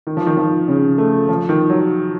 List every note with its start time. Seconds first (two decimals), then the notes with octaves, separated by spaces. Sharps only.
0.07 D#3
0.17 F3
0.27 D#3
0.37 F3
0.68 C#3
0.98 A3
1.29 F3
1.49 D#3
1.70 F#3